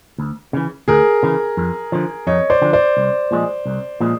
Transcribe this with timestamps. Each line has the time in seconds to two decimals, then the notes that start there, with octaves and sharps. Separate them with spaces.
0.18 D2
0.53 C#3 E3
0.88 D2 G#4 A#4
1.23 C#3 E3
1.57 F2
1.92 D3 F3
2.27 F2 C#5 D#5
2.50 C5 D5
2.62 D3 F3
2.73 C5 D5
2.97 C2
3.31 A#2 F3 G#3
3.66 C2
4.00 A#2 F3 G#3